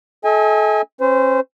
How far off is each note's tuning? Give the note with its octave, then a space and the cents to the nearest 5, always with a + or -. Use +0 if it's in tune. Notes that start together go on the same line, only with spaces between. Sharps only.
A4 -35 D#5 +45 G#5 -25
C#4 -40 C5 -25